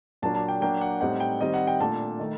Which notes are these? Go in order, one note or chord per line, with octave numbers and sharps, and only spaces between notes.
A#2 F#3 A#3 D4 A5
A5
G5
F#3 A#3 D4 G5
F#5
A2 G3 C4 D#4 F#5
G5
D#3 G3 C4 D#5
F#5
G5
A#2 A3 D4 A5
D#3 A3